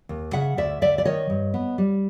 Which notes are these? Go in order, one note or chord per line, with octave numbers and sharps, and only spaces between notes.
D#2
C#3 E5 F#5
D2 D5 E5
D2 D5 E5
D5
D#3 C#5 D#5
G2
B3
G3